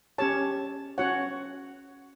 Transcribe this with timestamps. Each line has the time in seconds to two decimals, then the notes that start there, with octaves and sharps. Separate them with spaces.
0.18 C#4 G4 C#5 A5
0.98 C#4 F#4 C#5 F#5